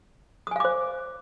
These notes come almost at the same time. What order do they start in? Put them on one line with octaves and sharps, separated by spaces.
D#6 G#5 F5 D6 C5